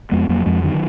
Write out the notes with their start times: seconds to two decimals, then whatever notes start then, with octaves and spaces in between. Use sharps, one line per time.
0.11 F2 G#3 B3
0.29 F2 F#3 A#3
0.46 F2 F3 G#3
0.63 D3 D#3 F#3